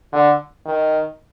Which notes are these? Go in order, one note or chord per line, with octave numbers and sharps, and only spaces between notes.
D3
D#3